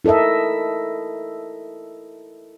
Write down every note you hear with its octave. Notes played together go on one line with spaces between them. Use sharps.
E4 A4 A#4 D#5 E5